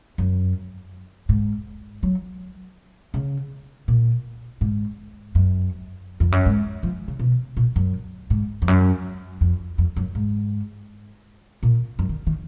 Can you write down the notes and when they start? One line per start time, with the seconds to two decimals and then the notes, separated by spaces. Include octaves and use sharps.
0.18 F#2
1.29 G#2
2.03 F#3
3.14 C#3
3.88 A#2
4.61 G#2
5.35 F#2
6.20 F2
6.32 F#2
6.46 G#2
6.83 F3
7.08 C#3
7.19 B2
7.57 A#2
7.76 F#2
8.30 G#2
8.62 F2
8.68 F#2
9.41 F2
9.78 F2
9.96 F#2
10.15 G#2
11.63 A#2
11.99 F#2
12.09 D#3
12.27 D#3